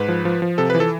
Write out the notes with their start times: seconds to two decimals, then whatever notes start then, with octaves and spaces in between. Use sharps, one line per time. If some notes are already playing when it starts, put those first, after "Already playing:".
Already playing: G#2 B4
0.08 F3
0.25 F3
0.42 F3
0.58 C3 A4
0.70 B4
0.75 E3
0.80 A4